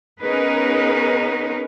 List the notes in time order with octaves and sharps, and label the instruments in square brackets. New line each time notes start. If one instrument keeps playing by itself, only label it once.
[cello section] B3 C#4 D#4 G#4 A#4 B4